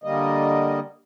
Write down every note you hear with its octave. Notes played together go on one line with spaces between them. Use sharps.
D3 G3 A#3 D#5